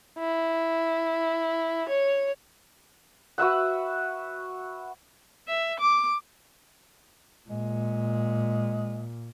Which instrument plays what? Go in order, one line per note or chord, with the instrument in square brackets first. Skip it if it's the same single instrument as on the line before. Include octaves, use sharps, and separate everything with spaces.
[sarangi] E4
C#5
[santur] F#4 B4 E5 F#5
[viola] E5
D6
[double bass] A#2 [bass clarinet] G#3